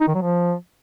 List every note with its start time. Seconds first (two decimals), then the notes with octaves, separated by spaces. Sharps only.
0.01 D#4
0.08 D#3
0.15 F#3
0.22 F3